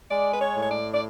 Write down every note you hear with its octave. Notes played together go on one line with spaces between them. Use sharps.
G#3 D5
B4
C#5
A2
C#5
D5
D5